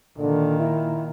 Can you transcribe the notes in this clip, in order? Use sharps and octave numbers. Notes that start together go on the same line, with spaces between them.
A#2 D3 D#3
E4